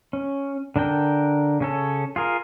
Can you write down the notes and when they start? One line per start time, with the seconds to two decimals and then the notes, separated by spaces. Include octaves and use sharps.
0.13 C#4
0.76 D3 D4 A#4 G5
1.60 C#3 C#4 A4
2.16 F4 G#4 A#4